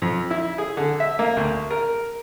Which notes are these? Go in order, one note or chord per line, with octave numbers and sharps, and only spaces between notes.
F2
E4
G#4
D3
E5
A#3
D2
A#4